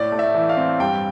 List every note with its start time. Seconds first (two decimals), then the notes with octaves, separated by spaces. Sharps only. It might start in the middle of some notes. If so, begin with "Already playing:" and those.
Already playing: A2 D5
0.12 A3
0.19 E5
0.35 E3
0.49 F5
0.57 C4
0.80 G2 G5